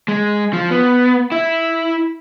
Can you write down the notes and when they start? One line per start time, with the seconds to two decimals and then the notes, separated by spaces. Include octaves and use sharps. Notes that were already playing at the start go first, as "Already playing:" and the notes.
0.08 G#3
0.53 F3
0.70 B3
1.32 E4